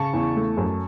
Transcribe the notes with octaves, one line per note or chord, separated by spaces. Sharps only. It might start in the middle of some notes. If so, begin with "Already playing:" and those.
Already playing: C#3 A5 C#6
E2
A3
F#2